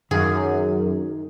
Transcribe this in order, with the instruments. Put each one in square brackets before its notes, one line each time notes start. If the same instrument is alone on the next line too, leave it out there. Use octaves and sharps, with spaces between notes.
[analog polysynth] F#2 [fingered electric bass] D#3 [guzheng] G#4